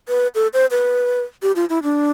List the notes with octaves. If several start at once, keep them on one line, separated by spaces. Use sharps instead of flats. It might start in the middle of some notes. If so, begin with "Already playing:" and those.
B4
A4
C5
B4
G4
F4
E4
D4